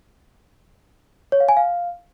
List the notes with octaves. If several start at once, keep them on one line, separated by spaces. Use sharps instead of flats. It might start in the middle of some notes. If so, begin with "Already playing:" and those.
C#5
F5
G#5
F5